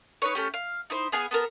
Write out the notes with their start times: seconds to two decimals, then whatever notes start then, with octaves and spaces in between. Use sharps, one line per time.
0.22 D#4 B4 C#5
0.35 A3 C#4 G4
0.54 F5
0.90 D#4 E4 C5
1.12 B3 G#4 F5 G#5
1.31 B3 A4 A#4